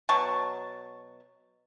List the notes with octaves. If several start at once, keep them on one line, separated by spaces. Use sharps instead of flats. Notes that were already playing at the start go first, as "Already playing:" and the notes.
B2 F#3 A5 C#6